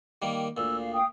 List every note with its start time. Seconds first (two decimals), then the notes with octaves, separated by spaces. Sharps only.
0.22 D#3 G3 A#3
0.57 D2 A#2 E6
0.79 F5
0.93 F5 G5 D#6